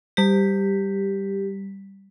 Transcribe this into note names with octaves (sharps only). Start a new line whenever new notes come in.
G3 G4 B6